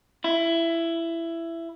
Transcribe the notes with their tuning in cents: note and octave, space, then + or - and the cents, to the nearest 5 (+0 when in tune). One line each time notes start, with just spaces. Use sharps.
E4 +15